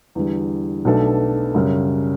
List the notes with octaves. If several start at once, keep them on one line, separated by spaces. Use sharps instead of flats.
E2 D3 G3
B1 B2 A3 D4 A4
F#2 C#3 G3 C#4